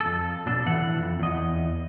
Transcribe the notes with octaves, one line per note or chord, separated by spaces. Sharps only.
F2 A4
B2 D4 A4
A2 E3 F#5
F2
E2 D#5